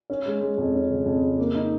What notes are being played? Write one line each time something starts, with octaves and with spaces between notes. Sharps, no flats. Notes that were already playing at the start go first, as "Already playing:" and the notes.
C#4
G#3
G#3
F2
C#4
C#3
F2
C#3
A#3
D#4